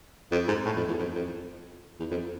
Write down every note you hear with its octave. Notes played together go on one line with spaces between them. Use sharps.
F2
G#2
A2
F2
E2
F2
F2
E2
F2